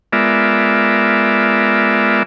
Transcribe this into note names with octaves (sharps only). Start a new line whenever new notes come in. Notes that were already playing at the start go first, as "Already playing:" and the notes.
G#3 B3 F4 A#4 D5 E5